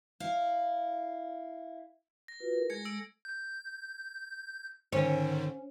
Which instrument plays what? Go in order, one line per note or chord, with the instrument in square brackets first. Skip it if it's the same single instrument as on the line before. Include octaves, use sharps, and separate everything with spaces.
[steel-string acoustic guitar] E4 F5
[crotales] A#6
[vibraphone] F4 F#4 B4
E4 G#4 A#4
[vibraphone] G#3 A3 A4 [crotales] G#6 A#6 C#7
[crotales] E6 D7
[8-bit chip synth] G6
[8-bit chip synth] G#2 D3 D#3 [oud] C#4 [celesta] C5